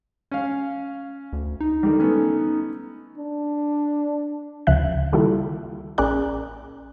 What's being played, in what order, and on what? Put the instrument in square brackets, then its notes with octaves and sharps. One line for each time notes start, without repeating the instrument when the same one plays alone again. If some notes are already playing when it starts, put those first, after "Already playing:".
[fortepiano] C#4 F5
[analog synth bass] D2
D#4
[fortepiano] D3 D#3 G3
A3 B3 C#4
[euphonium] D4
[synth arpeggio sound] D2 C#3 F3 E5 F#6
D#3 G3 A#3 E4 F4 A4
A#1 C#4 G#4 A#4 D5 F#6